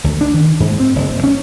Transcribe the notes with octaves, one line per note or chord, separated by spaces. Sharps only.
D2
D4
D#3
G#2
C4
F#1
C3
C#4